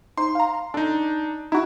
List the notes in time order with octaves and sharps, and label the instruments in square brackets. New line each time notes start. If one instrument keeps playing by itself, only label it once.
[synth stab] D#4 C5 [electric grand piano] C6
[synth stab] F5 A#5
[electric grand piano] D4 D#4 [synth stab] A4
[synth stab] D#4 F#4 [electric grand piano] E4